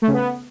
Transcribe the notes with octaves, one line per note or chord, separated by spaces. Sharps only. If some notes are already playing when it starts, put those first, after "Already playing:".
A3
C#3
B3